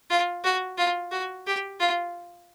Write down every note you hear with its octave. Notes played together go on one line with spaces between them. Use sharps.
F4
F#4
F4
F#4
G4
F4